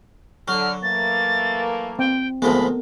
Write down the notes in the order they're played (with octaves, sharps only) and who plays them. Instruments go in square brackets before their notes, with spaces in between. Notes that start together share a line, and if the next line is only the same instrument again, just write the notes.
[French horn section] D3 [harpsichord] F#3 [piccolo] F6
[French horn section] E3 A3 A#3 [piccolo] A6
[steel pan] C4 [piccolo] G5
[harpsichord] D2 F3 G#3 [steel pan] B3 A4 A#4 [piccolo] B5